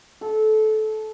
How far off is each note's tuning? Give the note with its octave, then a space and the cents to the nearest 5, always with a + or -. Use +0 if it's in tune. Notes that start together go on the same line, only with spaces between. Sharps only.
A4 -20